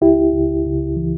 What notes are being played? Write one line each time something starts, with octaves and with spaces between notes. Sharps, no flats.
C#2 E4 G4
C#2
C#2
E3